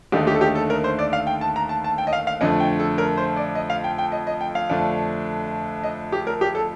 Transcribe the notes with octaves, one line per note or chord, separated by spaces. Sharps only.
D#2 D3 A3 D#4 G4
G4
A4
G4
A4
A#4
C5
D5
F5
G5
A5
A#5
A5
A5
G5
D#5
F5
F5
F2 D3 A3 D#5
G5
A4
A#4
C5
D5
D#5
F5
G5
G5
D#5
D#5
G5
F5
F2 D3 A3 D4
D#5
G4
A#4
G4
A4